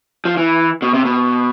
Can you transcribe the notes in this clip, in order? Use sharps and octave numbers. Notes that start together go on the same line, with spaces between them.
F3
E3
B2
C3
B2